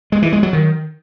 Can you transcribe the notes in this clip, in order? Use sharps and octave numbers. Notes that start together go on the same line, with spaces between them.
G#3
E3
G#3
F#3
D#3